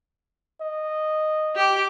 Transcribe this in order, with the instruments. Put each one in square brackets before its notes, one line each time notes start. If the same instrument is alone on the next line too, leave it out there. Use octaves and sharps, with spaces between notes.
[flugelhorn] D#5
[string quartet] G4 D6